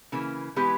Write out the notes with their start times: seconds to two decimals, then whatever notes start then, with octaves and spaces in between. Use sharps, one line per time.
0.12 C#3 E3 A#3
0.56 E3 G#3 B3 G4 B4